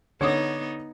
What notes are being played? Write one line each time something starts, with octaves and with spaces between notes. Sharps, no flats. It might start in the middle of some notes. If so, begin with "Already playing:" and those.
D3 B3 D#4 C#5 D6 D#6